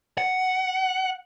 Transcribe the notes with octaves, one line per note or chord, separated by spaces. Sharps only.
F#5